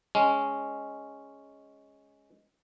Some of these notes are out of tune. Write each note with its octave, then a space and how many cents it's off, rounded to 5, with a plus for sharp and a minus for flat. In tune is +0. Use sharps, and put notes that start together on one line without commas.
G#3 +0 C#4 +0